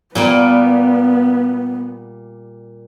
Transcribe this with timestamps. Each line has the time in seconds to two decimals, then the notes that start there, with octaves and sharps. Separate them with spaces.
0.15 A#2 G3 A#3 B3